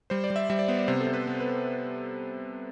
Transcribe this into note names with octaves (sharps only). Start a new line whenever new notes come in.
G3 C5
D5
G3
E5
G3 E5
D5
B3 C5
D5
C3 C5
A4
C3
B4
B3
B4